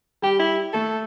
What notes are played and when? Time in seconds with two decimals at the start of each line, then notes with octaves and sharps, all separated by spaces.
0.22 G3 G4
0.39 E4
0.73 A3 A4